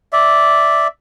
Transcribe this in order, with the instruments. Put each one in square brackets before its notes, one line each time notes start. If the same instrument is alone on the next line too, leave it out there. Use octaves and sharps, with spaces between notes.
[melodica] D5 E5